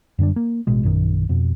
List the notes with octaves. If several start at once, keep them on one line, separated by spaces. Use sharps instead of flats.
F#2 D3 G3 D4
A#3
A1 B2 G#3
A#1 F#2 D#3
F2 B2